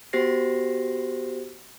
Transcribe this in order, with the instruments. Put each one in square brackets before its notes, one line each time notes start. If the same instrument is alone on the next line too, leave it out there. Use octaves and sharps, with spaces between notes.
[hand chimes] B3 F#4 G4 C5 A#6 C7